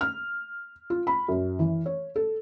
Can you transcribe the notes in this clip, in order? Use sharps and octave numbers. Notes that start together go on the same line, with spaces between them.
F6
F4
B5
F#2
E3
C#5
A4